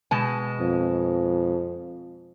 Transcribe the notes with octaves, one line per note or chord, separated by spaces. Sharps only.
B2 G#3 A5
F2